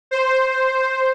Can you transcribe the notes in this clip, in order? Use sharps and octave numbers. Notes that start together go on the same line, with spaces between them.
C5